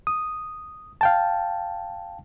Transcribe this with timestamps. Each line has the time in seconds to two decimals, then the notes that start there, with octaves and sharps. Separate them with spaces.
0.07 D#6
1.01 F5 G5 A5